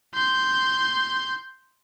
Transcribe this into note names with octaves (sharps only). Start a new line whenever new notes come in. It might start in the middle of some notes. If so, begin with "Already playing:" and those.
C6 G6